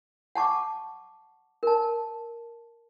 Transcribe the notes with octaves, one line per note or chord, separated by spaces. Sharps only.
F#5 A5 C#6 D6
A#4 A5